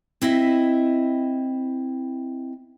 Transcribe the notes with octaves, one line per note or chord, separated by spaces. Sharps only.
C4 E4 D#5 E5